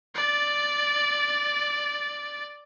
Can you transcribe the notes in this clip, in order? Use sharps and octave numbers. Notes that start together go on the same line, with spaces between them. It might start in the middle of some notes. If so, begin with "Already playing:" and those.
D5 A6